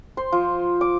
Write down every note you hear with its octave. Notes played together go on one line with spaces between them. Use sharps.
C5
F3
D6